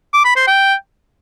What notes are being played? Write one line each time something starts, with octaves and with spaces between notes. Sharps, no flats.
D6
B5
C5
G5